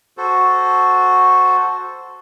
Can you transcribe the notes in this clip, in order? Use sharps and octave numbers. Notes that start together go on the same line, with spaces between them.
F#4 A4 C5